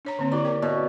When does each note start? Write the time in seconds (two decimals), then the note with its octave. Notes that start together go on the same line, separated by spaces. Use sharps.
0.05 D4 C#5 A#5
0.19 D3 A#3 C4
0.32 E4 G4 D5
0.44 A#4 C#5 G5
0.62 B2 B3 C#5 E5